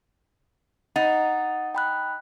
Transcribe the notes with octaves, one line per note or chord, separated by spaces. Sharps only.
D#4 F#5 A6
G5 B5 F#6